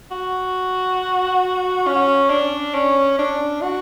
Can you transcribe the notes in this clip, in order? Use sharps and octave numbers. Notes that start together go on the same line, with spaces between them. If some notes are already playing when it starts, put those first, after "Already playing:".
F#4
C#4
D4
C#4
D4
F#4